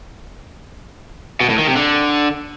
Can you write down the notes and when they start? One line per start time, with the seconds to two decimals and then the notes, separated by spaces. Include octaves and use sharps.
1.40 B2
1.49 A2
1.58 D#3
1.67 C3
1.76 D3